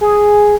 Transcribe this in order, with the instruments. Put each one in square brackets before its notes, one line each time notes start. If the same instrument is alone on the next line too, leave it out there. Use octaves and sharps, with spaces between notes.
[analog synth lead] G#4